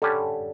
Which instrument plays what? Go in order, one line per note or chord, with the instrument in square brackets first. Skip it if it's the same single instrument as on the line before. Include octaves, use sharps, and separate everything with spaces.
[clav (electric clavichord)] D3 G3 C#4 G4 [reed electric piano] A4